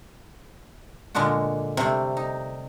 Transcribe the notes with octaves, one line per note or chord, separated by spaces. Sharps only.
A#2 D3 G#3 D4 F#4
C3 G3 A3
D#4